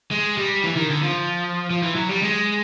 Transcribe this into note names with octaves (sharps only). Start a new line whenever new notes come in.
G#3
G3
E3
D#3
D3
F3
F3
E3
F#3
G3
G#3